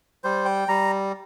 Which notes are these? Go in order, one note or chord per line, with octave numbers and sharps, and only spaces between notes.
G3 C5
G5
G3 A#5